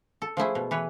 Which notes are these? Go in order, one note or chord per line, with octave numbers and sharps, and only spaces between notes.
A4
F3 A3 E4 G#4
B2
E3 B4 C#5